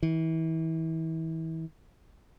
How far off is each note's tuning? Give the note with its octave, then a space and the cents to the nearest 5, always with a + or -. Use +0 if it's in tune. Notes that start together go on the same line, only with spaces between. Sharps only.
E3 -35